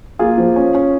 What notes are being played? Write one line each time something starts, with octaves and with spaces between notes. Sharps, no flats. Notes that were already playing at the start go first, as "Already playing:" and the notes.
A#3 F4 G#4
F3
C#4
C#4